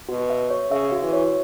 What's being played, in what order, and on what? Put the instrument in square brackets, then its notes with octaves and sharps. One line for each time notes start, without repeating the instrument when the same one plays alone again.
[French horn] B2 [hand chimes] F#4
[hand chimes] E5
C#5
[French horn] C#3 [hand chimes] E5
[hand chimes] F#4
[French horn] E3
[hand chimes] C#5